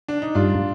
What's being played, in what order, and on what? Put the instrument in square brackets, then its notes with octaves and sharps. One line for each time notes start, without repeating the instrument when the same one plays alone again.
[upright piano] D4
D#4
[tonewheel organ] G2 [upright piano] D4 F4